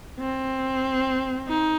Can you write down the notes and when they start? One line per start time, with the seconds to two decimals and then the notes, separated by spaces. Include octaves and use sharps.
0.19 C4
1.48 D#4